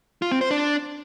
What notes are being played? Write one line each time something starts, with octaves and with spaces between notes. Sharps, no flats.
F4
C4
C5
D4